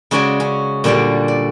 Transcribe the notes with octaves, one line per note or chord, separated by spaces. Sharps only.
C#3 G#3 F#4 C#5 D5 G#5
C#4
A#2 D3 G3 F#4 D5
D5